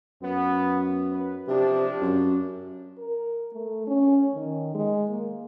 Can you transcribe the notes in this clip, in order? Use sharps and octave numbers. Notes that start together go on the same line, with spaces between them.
F#2 B3
B4
C3 F3 D4
F#2
A#4
A3
C#4
D#3
G#3
A#3